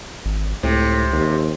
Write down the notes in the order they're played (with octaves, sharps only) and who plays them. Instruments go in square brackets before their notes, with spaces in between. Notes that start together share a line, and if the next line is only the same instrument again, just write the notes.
[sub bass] G#1
[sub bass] C#2 [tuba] A2 [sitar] C3
[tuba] D#2